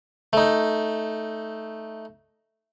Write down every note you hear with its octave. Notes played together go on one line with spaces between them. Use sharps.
A3 D#4